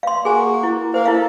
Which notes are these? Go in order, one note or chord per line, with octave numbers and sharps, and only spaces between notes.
F5 C6
A#3 F#4 G#4 G#5
E4
A#3 A#4 C5 F5
E4 A4 F5